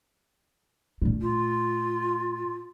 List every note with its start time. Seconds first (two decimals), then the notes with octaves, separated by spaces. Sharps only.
1.02 A#2 A3
1.21 F4